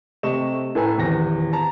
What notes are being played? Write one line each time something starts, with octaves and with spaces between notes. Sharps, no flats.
C3 A3 D#5 C#6 E7
A2 A4 B4 G#5 A#5
D#1 E2 A#6
A5 A#5